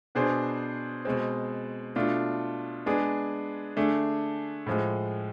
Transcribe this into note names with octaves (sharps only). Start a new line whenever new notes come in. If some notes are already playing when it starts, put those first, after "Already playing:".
B2 B3 D4 G#4 C5
B2 G#3 C4
B2 A3 D4 F4
G#3 B3 D4 G#4
D3 A3 D4 G#4
A2 F3 G#3